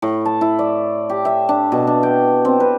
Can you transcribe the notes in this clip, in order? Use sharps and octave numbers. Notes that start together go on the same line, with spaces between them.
A2
A5
E4
D5
G4
E5
D4
B2
D4
G5
C4
B4